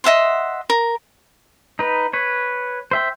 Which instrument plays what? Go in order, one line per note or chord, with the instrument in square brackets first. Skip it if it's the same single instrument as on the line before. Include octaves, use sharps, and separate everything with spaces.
[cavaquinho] D#5 E5 F#5 C6
A#4
[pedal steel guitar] D#4 B4
B4 C#5
C5 E5 G5